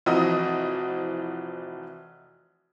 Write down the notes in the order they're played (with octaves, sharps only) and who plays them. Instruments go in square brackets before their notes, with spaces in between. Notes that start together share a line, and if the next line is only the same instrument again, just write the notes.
[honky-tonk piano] F1 E3 F3 F#4 D#5 D#6